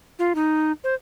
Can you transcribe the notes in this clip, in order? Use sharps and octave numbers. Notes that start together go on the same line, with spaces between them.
F4
D#4
C5